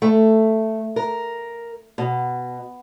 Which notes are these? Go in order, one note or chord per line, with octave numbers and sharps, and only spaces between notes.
A3
A#4
B2